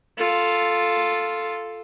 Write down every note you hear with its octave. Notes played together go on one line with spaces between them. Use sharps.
F4 A4